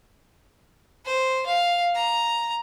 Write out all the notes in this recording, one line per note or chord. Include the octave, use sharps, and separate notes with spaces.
C5
F5
A#5